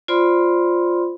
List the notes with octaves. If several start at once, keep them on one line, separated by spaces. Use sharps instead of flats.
F4 C5 D5 B5 C6